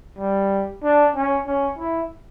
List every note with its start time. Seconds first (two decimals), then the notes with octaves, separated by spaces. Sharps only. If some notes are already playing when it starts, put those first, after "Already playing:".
0.19 G3
0.84 D4
1.15 C#4
1.47 C#4
1.79 E4